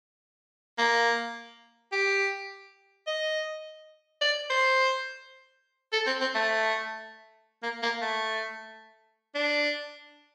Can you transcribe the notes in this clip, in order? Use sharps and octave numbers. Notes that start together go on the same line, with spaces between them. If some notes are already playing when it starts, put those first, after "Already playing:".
A#3
G4
D#5
D5
C5
A4
C4
C4
A3
A#3
A#3
A3
D4